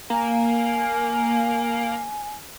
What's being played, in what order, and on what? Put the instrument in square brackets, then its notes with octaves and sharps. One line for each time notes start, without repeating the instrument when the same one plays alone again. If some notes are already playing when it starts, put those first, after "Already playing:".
[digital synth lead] A#3 [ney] G#5